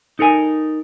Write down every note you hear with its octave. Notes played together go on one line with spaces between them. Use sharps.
D#4 A4 A#4 G#5